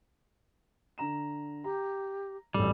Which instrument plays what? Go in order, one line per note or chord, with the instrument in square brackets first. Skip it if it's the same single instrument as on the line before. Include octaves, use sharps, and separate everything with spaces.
[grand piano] D3 A#5 E7
[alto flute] G4 [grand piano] A#5
[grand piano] D1 A1 [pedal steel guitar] G3 [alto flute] A4